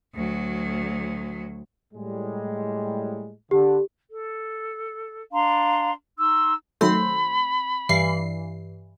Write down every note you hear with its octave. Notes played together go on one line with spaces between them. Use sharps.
D2 F#3
A2 G3 G#3
D3 G4
A4
D4 F5 A#5 C6
D#4 C6 E6
D#3 F#3 A3 C4 B5 C6
G2 E3 C7